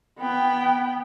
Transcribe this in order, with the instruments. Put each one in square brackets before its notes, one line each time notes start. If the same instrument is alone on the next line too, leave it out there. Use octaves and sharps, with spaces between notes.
[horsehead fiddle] B3 G5